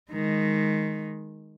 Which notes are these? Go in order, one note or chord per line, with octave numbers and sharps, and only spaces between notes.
D#3 G#3